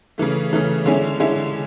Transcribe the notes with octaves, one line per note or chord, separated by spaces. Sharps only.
C#3 E3 A3
C#3 E3 A3
D3 G#3 C#4 E4
D3 G#3 C#4 E4